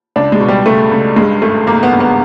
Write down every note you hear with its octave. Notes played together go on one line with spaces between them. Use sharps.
C#2 D4
G#3
B2
G3
C#2 A3
C#2
G2 G#3
G#1 A3
G#1 A#3
B3
G2
B3